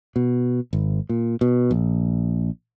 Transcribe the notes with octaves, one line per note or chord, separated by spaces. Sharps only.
B2
G#1
A#2
B2
A#1